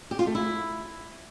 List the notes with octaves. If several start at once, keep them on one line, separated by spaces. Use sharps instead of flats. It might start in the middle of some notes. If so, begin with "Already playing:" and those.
G4
F4
A3
E4